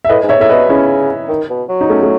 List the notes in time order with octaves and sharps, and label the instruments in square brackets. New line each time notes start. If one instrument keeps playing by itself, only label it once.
[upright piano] E5
[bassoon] A2 [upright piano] B4 D#5
[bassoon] G#2
[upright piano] C#5 E5
[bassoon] A2 [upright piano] E5
[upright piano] B4 D#5
[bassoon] B2
[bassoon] C#3 [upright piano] C#4 E4
[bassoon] D#3
B2
F#3
[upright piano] D#4
A3 C#4
A3